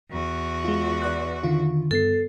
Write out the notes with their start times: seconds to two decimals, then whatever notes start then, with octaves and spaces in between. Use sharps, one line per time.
0.11 E2 F#4
0.64 G#3 F4
1.02 B4 D5 F#6
1.43 D3 D#3 F4
1.91 G2 B3 A4 C7